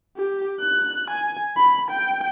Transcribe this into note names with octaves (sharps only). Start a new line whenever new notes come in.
G4
F#6
G#5
B5
G5